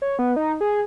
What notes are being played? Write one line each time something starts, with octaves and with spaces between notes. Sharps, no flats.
C#5
B3
D#4
G#4